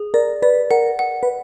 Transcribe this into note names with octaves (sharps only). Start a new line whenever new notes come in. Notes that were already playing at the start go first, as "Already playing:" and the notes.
Already playing: G#4
A#4 D5
B4 D5
A#4 F#5
F#5
B4